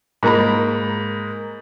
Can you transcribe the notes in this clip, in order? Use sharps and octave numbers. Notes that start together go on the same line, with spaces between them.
G#2 A#3 A#5 B5